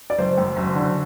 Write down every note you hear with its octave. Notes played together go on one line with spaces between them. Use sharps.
D5
F#1 C5
F#2
F#1
D3